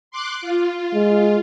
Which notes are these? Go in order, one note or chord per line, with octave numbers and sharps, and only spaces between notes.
C6 D6 F#6
F4
G#3